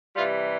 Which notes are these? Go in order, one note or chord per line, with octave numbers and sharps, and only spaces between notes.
C3 E3 G3 F4